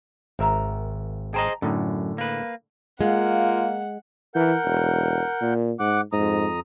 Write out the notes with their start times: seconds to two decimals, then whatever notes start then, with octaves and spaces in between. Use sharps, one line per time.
0.39 G#1 A#4 C5 E5 A#5
1.34 G#4 C5 D#5 G5 A5 A#5
1.62 F#2 A2 D3 G3 D#4 A4
2.18 A#3 B4
3.01 G#3 A#3 F4 F#5
4.35 E3 A#4 F#5 G6
4.65 E1
5.41 A#2
5.80 G#2 F#5 D6 F#6
6.13 F2 G#2 A#5 D#6